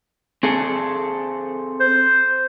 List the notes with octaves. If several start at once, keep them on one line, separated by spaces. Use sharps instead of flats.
C4 G#4 A4
C5